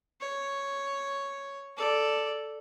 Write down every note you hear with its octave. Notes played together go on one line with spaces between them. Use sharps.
C#5
A4 D5